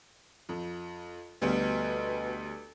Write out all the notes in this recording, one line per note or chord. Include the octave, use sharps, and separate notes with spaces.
F2
D2 B2 G3 B3